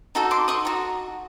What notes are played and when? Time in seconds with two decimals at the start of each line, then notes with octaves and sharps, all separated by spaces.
0.15 D#4 F#4 A4
0.31 C6 D6
0.48 C#6 D#6
0.65 D#4 F#4